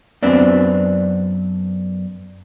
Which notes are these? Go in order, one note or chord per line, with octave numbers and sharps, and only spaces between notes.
F#2 B3 C4 D4